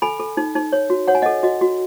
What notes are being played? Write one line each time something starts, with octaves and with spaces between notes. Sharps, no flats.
A4 G#5 B5
A4
D#4
D#4
C#5
F#4
C#5 F#5
G#5
A4 D#5 F#5
F#4 D#5
F#4